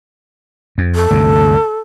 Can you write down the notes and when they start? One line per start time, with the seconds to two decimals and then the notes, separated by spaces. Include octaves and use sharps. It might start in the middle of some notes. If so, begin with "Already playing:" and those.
0.78 F2
0.95 A4
1.11 D2 G2 C3